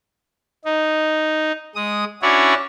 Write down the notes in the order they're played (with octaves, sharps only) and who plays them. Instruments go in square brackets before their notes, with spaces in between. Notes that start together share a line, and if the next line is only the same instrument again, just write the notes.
[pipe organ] D#4
G#3 D#6
C#4 D4 E4 F#4 C#5 D5